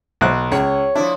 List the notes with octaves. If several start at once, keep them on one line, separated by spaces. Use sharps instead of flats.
B1 F#6
C#2 C#5
F3 D4 E4